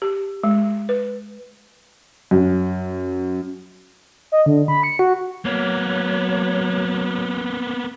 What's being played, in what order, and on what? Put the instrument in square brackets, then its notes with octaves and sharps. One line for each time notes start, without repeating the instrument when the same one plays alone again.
[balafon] G4
G#3
B4
[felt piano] F#2
[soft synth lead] D#5
D3
B5
C#7
F#4
[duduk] F#3 [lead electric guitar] A#3 B3 [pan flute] C#5